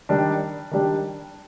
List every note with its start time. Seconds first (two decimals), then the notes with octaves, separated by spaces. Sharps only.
0.09 D#3 G3 D4
0.71 D#3 G3 D4 G4